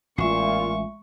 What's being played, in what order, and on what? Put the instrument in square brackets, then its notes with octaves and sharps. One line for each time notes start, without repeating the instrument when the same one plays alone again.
[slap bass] A1 [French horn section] A#2 F4 [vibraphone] G#3 E5 [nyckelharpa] C#6